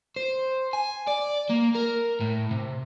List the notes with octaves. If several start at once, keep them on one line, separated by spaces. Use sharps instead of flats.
C5
G#5
D5
A#3
A#4
A2
C3